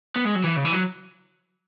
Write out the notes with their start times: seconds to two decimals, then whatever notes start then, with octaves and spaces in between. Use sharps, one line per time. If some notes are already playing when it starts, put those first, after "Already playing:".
0.16 B3
0.25 G#3
0.35 F#3
0.44 E3
0.56 C#3
0.65 E3
0.73 F#3